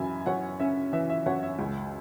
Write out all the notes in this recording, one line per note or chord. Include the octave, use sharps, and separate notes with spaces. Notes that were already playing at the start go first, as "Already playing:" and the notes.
Already playing: F#2 E3 C#4 E5 G#5 B5
F#2 C#5 F#5
C#4 E5
E3 E5
E5
F#2 C#5 F#5
E5
C#2